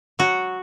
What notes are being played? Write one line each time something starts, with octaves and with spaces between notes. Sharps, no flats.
F#3 F#4